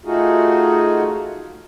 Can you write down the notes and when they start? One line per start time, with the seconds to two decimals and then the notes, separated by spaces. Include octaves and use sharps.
0.05 A3 D#4 F4 F#4 G#4